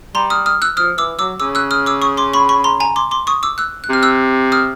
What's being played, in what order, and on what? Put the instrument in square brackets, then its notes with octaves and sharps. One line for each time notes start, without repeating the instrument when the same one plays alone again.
[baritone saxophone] G3 [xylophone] A#5 C6
[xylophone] D#6 F6
D#6 F6
E6 F#6
[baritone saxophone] F3 [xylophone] D#6 F6
[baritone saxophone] E3 [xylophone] D6 E6
[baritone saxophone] F#3 [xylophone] D6 E6
[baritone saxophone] C#3 [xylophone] D6 E6
[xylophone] E6 F#6
D#6 F6
D6 E6
C#6 D#6
C6 D6
B5 C#6
B5 C#6
A#5 C6
G#5 A#5
C6 D6
C6 D6
C#6 D#6
D6 E6
E6 F#6
F#6
[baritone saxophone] C3 [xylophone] F6
[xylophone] E6 F#6
D#6 F6